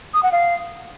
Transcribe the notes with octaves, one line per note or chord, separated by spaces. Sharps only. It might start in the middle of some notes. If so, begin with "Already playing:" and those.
D#6
F#5
F5